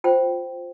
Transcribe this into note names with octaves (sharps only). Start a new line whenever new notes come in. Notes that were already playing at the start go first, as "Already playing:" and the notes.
F4 C5 G5